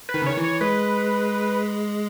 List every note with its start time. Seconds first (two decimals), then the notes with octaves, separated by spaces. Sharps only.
0.09 B4
0.14 D#3
0.22 C#3
0.26 D#3 C#5
0.37 E3
0.44 C#5
0.61 G#3 B4